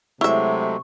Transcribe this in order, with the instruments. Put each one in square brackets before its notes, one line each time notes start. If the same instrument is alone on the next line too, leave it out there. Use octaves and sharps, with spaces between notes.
[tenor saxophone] C3 [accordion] F#3 G#3 A3 [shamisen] E4 E5 [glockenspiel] C#6